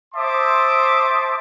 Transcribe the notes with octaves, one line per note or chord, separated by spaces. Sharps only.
C5 E5 A5 C6 D6 D#6